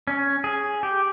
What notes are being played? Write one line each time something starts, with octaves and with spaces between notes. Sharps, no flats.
C#4
G#4
G4